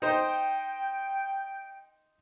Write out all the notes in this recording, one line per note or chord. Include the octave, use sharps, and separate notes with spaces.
D#4 C5 G5